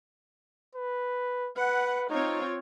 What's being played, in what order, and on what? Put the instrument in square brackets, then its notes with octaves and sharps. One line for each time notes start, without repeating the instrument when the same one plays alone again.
[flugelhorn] B4
[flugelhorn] B4 [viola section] F#5
[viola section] C4 F4 C#5 [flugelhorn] D#4